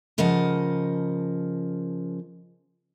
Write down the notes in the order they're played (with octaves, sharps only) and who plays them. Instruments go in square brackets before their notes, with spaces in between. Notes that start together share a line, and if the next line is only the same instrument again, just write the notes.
[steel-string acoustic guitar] C#3 F3 A#4 D#5 F#5 A5